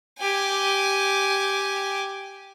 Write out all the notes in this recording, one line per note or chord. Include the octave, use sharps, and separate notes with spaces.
G4 G#5